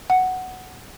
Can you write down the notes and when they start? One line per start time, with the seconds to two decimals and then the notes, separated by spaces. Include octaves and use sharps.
0.10 F#5